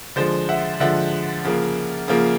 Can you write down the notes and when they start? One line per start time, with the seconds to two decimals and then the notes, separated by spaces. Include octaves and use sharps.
0.16 D3 F3 G#3 C5
0.49 E5 F#5
0.80 D3 F3 G#3 E5 F#5
1.45 C#3 F3 A#3
2.08 C#3 F3 A#3